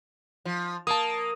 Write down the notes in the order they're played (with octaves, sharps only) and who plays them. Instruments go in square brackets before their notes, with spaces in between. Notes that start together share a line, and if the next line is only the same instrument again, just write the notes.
[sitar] F3
[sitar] A#3 [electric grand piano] A5 D#6